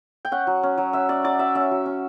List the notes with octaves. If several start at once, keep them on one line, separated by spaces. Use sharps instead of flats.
G5
C#4 F#5
F#3
C#4
F#3
C#4 E5
C#4 D5
F#3 D5
F#3 E5
C#4 E5
F#3
C#4